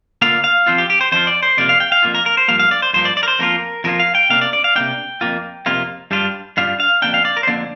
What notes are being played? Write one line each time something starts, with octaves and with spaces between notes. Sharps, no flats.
D3 A#3 F4 F5
F5
F2 F3 C4 F4 C5
G4
G4
C5
F2 F3 C4 F4 C5
D5
C5
F2 C3 A#3 F4 D5
F5
G5
F5
F2 C3 A#3 F4
A#4
A#4
C5
G2 F3 A#3 F5
F5
D5
C5
G2 F3 A#3 C5
D5
D5
A#4
C5
F2 F3 A#3 F4 A#4
F2 F3 A#3 F4 A#4
F5
G5
C3 A#3 D4 F5
D5
D5
F5
C3 A#3 D4 G5
F2 C3 A#3 F4
F2 C3 A#3 F4
G2 G3 D4 F4
G2 G3 D4 F4 F5
F5
F2 D3 A#3 D4 G5
F5
D5
A#4
C5
F2 D3 A#3 D4 D5